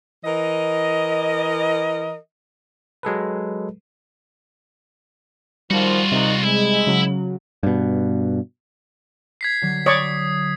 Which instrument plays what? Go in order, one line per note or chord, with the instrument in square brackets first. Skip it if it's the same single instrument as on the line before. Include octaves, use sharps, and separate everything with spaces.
[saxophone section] E3 A#4 D#5
[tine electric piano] F#3 G#3 A4 B4
[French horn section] D#3 F3 [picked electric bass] G3 [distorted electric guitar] F4 F#4
[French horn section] D#2 D#3 D#4 [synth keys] C3
[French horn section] G#3 [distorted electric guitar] E4
[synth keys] C#3 F#3
[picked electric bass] G2 B2
[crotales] G#6 B6 C7
[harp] D3 F#3
[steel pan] C#5 D5 C#6 [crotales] D#6